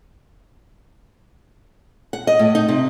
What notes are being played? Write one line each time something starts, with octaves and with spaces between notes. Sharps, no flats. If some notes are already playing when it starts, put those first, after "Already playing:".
F#5
D#5
A2
D#4
C3